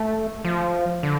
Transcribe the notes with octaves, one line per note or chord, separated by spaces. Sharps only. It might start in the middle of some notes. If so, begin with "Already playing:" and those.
Already playing: A3
F3
D3